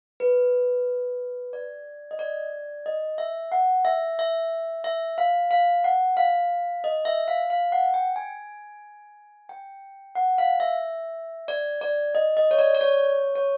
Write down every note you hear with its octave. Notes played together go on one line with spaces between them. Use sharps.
B4
D5
D#5
D5
D#5
E5
F#5
E5
E5
E5
F5
F5
F#5
F5
D#5
E5
F5
F5
F#5
G5
G#5
G5
F#5
F5
E5
D5
D5
D#5
D#5
C#5
D5
D5
C#5
C#5